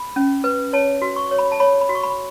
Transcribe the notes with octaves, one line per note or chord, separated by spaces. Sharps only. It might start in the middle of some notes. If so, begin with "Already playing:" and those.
Already playing: B5
C#4
B4
C#5 A5
F#4
C#6
C#5
B5
A5
C#5 B5
B5
F#4
C#6
B5